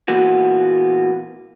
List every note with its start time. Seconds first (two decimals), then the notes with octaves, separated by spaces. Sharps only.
0.08 A#2 E3 A#3 B3 F#4